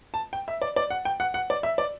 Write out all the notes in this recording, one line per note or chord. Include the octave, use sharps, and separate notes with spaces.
A5
G5
E5
D5
D5
F#5
G5
F#5
F#5
D5
E5
D5